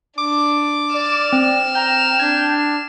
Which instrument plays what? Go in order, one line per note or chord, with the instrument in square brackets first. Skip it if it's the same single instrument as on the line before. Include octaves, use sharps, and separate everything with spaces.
[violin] D4 [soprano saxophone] D6
[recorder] D5 [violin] F6 E7
[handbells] C4
[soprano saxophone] G5 [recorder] A#5
[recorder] D4 [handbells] G#6